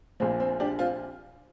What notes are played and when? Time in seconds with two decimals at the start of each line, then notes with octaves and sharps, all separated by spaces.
0.20 A#1 A#2 F3 C4
0.40 C4
0.60 D4 G4
0.79 C4 F4